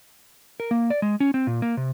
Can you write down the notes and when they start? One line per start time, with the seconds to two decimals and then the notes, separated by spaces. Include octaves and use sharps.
0.60 A#4
0.71 A#3
0.90 D5
1.02 G#3
1.20 C#4
1.34 C4
1.47 A#2
1.62 A#3
1.77 C3